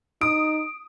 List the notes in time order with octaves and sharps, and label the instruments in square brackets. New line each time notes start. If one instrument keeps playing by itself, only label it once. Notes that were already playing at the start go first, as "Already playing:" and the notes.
[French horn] D#4 [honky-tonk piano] D#6 [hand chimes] D7